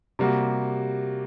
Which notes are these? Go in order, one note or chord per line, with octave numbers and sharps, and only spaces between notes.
C3 G3 A#3 F#4